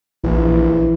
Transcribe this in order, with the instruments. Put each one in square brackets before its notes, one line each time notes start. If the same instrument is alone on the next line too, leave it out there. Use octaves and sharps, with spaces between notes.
[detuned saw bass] A#1 [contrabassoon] E3